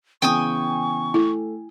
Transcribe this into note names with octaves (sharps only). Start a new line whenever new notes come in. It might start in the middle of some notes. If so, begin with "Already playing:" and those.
C#3 E3 B3 G5 G#5 C#6 D#6
A3 E4